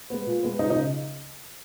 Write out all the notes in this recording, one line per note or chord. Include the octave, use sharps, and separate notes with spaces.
G#3 B3
A#2
G#3 B3
C#2 D#4 D#5
D#4 D#5
C#3